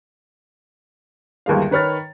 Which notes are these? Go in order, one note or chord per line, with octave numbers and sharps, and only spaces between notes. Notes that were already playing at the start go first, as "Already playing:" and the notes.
G1 D#2 G#3 F5
D#3 B4 C#5 F6 A6